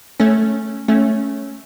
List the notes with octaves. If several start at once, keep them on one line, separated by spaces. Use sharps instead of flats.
A3 C#4
A3 C#4